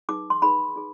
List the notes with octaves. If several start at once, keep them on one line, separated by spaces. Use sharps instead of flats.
D#4 G#4 B4 D6
C6
D#4 G#4 B4 B5
D#4 G#4